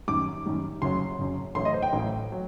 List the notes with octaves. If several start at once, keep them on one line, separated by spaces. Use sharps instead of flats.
F#2 D#3 G3 D6
F#2 D#3 G3
F#1 F#2 F#3 C6
F#1 F#2 F#3
A1 A2 F#3 C6
D#5
C5
G5
A1 A2 F#3
F#3